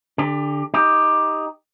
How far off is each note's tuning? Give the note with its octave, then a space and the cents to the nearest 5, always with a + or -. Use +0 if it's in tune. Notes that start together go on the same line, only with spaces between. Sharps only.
D3 +0 G4 +30
D#4 +10 G4 +10